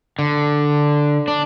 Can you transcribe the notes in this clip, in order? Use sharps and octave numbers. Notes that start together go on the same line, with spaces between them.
D3
D4